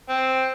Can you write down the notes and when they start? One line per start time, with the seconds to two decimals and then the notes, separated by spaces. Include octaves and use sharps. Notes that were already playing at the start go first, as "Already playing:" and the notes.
0.09 C4